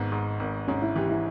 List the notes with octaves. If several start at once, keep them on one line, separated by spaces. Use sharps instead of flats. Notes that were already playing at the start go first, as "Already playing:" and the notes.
Already playing: G#1 G#2 B3
G#2
G#1
G#2 C#4
E4
E3 G4
E4